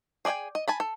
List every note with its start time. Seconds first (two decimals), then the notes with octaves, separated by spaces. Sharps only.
0.25 G#4 D5 D#5 G5 G#5
0.55 D#5
0.68 G#5 A5 B5
0.80 A4